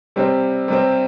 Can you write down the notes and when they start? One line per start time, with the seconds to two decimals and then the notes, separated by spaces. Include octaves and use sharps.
0.16 C3 G3 C4
0.68 C3 G3 C4